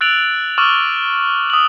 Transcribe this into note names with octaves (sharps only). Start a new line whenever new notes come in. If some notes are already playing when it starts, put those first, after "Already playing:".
E6 F#6 A6 D7 F7 F#7
C#6 D6 E6 F6 A6 F#7
D#6 F#7